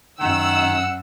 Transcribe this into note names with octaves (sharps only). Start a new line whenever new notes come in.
F#2 D#3 F#5 E6